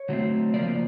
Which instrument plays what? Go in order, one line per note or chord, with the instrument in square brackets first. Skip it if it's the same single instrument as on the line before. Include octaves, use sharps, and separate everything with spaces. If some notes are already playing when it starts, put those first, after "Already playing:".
Already playing: [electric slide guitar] C#5
D3 F#3 A3 C4
C#3 F3 A#3 D5